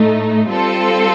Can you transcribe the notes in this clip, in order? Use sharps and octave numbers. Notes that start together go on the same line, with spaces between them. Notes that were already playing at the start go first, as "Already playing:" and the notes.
Already playing: A2 A3 D#4
G3 C4 F4 A4